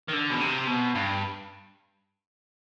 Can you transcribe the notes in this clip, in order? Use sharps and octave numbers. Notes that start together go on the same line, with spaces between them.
D#3
D3
B2
C3
B2
G2